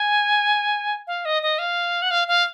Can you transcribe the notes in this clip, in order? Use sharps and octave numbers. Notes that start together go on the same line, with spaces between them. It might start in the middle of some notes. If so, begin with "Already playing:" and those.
Already playing: G#5
F5
D#5
D#5
F5
F#5
F5
F5